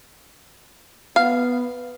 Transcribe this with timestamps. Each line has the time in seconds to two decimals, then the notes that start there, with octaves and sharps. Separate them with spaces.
1.16 B3 F5